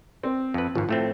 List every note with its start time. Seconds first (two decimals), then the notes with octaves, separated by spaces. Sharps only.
0.23 C4
0.54 F2 B4
0.75 G#1 G#2 F3
0.89 A2 A3 C4